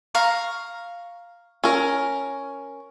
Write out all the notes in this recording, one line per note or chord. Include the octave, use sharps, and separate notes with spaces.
F5 A#5 C#6
C#4 A#4